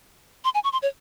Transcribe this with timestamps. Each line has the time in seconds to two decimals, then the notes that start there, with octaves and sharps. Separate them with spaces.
0.44 C6
0.54 G#5
0.64 C#6
0.73 C6
0.82 C#5